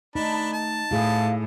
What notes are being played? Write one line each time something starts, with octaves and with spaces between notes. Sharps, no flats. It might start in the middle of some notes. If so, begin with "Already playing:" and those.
A3 D4 D#4 A5 B5
A5
A2 E4 G#4 F5